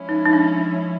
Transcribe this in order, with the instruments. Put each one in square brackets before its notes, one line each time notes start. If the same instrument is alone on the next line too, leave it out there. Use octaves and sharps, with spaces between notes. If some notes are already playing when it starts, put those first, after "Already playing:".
Already playing: [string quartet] F3 G#3 C#4 E4
[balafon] D#4
D#4
D4